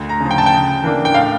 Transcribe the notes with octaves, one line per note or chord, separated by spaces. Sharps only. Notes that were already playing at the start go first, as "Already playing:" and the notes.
Already playing: D2
A#5
C#3 F3
G5
A5
G5
C#3
E3 A#3 D4
G5
A2 F5